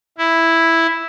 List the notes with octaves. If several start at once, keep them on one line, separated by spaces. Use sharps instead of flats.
E4